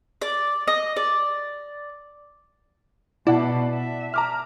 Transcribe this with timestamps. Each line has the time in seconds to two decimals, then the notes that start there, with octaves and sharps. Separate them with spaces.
0.22 D5
0.67 D#5
0.97 D5
3.27 B2 E4 D5 F#5 A5
3.73 E5
4.14 A#5 D6 F6